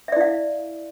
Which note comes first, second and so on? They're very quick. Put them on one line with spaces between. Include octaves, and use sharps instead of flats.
E5 D5 E4 F5